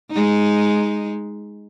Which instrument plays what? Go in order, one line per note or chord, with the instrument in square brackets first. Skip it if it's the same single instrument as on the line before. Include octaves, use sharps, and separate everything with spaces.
[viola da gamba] G#3 D#4